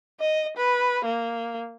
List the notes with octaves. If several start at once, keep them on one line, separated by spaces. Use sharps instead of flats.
D#5
B4
A#3